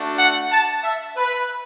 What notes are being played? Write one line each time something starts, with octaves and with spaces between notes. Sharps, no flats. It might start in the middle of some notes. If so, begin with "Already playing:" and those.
Already playing: A3 D4 F#4
F#5
A5
E5
B4